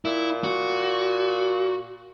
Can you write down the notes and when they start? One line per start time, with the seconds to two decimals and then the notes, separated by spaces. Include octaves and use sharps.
0.05 A#2 E4
0.44 F#4